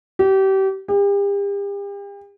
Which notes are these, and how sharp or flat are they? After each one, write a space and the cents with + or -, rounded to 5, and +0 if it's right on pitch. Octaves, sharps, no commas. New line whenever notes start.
G4 -30
G4 +40